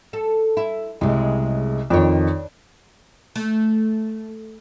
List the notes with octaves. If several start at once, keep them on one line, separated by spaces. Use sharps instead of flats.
A4
E4
C2 C#3 G#3
F2 D#3 D4 C#5
A3